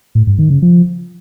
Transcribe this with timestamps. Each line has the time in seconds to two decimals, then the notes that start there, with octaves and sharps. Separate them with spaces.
0.15 A2
0.27 G2
0.39 D#3
0.50 C#3
0.62 F3